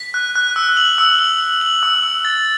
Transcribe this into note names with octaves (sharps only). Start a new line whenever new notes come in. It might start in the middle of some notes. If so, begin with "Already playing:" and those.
Already playing: B6
F#6
F#6
E6
F#7
E6
F#7
F#7
F#7
E6
E6
A6